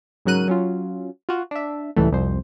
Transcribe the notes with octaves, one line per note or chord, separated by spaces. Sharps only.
G#2 C#3 F#3 A#4 F#6 D#7
F#3 C#4 F4
F4 F#4
D4 E5
C#2 A2 E3 G3 A3
C2 F2 C5